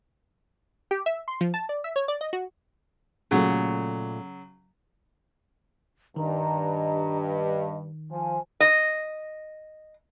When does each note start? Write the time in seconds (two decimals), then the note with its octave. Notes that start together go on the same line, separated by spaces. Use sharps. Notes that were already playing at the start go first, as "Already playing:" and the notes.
0.91 G4
1.06 E5
1.28 C6
1.41 F3
1.54 A5
1.69 D5
1.84 E5
1.96 C#5
2.08 D5
2.21 D#5
2.33 F#4
3.31 A#2 C#3 F#3 A3
6.16 G2 D#3 D#5 A#5
7.18 D#5
8.11 F3 G#5
8.60 D#5